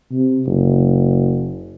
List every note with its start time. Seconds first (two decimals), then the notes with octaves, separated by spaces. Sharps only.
0.12 C3
0.47 F#1